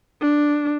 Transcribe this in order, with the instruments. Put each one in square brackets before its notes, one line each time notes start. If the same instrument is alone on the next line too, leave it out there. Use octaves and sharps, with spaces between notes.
[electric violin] D4